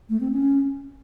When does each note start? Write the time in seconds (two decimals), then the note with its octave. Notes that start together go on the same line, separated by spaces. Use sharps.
0.10 A3
0.20 C4
0.31 C#4